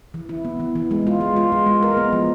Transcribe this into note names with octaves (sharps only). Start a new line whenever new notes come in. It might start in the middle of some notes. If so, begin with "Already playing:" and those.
E3
E4
B3
E3
E3
G#3
F4
G#3
F4
G#3
G#3
A#4
B3
F3